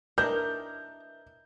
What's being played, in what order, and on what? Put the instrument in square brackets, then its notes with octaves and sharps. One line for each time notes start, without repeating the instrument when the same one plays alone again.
[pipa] E3 D4 D#4 [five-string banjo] A#4 [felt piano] G6